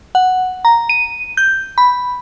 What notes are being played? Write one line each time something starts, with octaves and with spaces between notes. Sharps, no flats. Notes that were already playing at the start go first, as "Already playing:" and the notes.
F#5
A#5
D#7
G6
B5